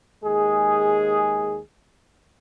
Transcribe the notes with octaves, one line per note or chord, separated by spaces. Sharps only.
D#2 G#3 G#4